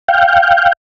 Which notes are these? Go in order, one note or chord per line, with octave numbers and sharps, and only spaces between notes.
F5 G5